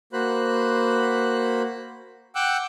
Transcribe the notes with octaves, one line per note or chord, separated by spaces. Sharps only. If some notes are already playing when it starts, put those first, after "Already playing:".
A#3 F#4 C5 B5 F#6
F#5 G5 D6 E6 F#6 G6